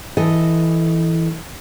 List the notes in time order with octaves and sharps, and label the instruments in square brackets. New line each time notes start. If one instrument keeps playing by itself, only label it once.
[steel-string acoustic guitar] E3 A4 D#5